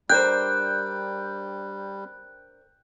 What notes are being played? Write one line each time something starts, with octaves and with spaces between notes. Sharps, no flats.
G3 D4 A#4 C5 G5 F#6